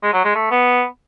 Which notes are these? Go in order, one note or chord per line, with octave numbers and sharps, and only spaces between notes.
G#3
F#3
G#3
A3
B3